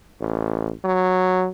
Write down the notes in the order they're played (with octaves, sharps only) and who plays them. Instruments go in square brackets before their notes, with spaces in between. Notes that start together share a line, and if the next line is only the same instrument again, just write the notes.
[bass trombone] A1
F#3